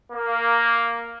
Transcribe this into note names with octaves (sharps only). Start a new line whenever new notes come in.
A#3